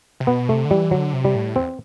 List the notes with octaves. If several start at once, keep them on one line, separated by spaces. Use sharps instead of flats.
C3
B2 B3
C3 A3
D3
E3 G3
D3 F#3
C3
G3
A2
E2 C4